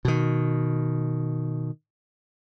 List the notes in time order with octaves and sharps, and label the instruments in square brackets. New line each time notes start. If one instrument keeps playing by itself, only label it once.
[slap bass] B2 D#3